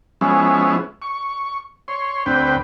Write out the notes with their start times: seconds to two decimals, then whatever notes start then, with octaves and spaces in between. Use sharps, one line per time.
0.21 F3 G#3 B3 C#4 E4
1.02 C#6
1.88 C#5 C6
2.26 D2 C4 B4 G5